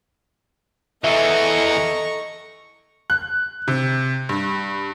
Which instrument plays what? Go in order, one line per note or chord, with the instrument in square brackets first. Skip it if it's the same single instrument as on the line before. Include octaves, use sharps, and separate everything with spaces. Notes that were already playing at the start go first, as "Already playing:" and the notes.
[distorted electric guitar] E2 E3 [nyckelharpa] A4 D#5 [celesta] E5 [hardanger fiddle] A#5 C#6
[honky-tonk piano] F#6
C3
G2